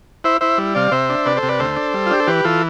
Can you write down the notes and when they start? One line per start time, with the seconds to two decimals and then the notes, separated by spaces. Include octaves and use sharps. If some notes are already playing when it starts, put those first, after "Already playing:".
0.24 E4 C5 E5
0.41 E4 C5 E5
0.58 G3
0.75 C3 D5 F5
0.92 C3 C5 E5
1.10 D4
1.25 C3 B4 D5
1.37 A4 C5
1.43 C3
1.49 B4 D5
1.59 D2 A4 C5
1.76 D4
1.94 G3
2.06 F4
2.11 D4 G4
2.20 A4
2.27 E3 G4 B4
2.44 E3 F4 A4